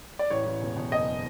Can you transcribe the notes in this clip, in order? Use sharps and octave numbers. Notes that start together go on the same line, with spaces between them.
D5
A1 C#5
A1
E1
E1
F#1 D#5